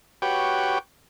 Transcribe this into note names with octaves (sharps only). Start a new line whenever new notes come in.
F#4 G4 B4 C#5 G5